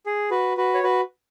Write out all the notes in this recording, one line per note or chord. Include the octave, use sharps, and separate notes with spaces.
G#4
F#4 B4
F#4 B4
C#5
F#4 B4